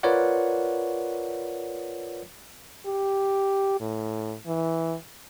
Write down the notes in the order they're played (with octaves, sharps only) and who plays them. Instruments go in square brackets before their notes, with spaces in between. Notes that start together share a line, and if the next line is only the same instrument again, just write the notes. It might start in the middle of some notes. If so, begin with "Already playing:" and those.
[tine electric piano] F4 A#4 B4 C#5 D5 F#5
[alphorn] G4
A2
E3